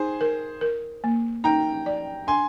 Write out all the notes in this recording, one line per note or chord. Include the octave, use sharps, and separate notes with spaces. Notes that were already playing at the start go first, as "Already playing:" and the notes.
Already playing: D#4 G#4 C5
A#4
A#4
A#3
D#4 G5 A#5
D5
D4 G#5 C6